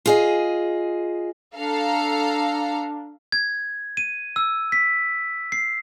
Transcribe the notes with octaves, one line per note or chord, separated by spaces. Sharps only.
F4 G#4 D#5
D4 A4 F5 A#5
G#6
D#7
E6
B6
C7